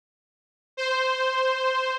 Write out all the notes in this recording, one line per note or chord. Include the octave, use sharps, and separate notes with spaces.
C5